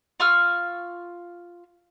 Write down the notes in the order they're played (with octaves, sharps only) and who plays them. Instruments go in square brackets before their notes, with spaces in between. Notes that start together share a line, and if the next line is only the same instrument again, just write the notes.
[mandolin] F4 C#6 E6 F6